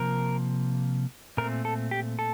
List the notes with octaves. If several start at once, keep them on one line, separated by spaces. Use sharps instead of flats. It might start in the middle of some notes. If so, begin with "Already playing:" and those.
Already playing: C3 F3 A#3 A#4
A#2 A3 C4 A#4
A4
G4
A4